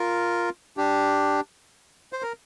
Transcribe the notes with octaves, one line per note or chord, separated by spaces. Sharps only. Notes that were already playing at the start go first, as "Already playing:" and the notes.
Already playing: F4 A#4
D4 G4
C5
A#4